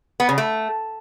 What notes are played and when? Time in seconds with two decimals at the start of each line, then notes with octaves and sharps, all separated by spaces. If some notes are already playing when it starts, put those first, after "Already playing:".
0.20 B3
0.29 C#3
0.38 A3